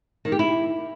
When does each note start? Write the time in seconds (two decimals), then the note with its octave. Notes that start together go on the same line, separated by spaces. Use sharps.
0.25 D#3
0.32 G4
0.39 E4